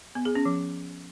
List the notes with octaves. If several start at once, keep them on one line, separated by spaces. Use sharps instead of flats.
B3
G#4
C#4
F3